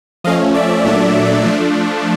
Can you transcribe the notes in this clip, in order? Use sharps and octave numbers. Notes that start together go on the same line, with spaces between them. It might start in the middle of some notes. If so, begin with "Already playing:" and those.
F3 A3 C#4 D#5 F5
D5 E5
A#2 F#3 A3 D4
F3 A3 D4